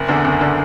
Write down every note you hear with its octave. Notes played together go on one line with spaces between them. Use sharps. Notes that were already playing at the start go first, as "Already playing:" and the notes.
Already playing: F#1
E2 D3
F#1
D3